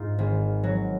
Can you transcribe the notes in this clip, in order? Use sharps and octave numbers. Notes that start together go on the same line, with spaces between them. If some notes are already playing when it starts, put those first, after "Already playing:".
Already playing: G#2 D#4 F4
G#1
F#3